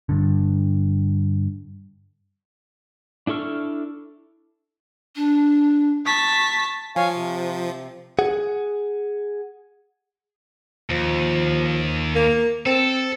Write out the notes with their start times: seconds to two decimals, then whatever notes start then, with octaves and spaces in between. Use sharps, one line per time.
0.09 G2 D3
3.27 D4 E4 A4 C#6 F6
5.16 D4
6.05 A5 C#6 B6
6.96 F3 C#5 F5 G#5
7.15 C3
8.19 G#4 F#5
10.90 D#2 F3
12.15 A#3
12.66 C4 A4